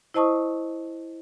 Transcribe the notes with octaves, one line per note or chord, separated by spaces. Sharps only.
E4 C5 D#5 A5 C#6 D#6